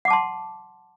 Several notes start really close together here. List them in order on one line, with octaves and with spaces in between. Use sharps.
F#5 D6 A5 C6